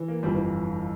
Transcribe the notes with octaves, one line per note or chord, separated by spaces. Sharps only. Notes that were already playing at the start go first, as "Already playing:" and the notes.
Already playing: E3
A#3
G1 F2 E3 G3
E3